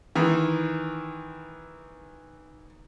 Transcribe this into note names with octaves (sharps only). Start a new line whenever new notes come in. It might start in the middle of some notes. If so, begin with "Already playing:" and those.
D#3 E3